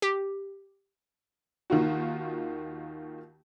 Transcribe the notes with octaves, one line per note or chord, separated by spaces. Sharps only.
G4
D#2 D#3 F4 F#4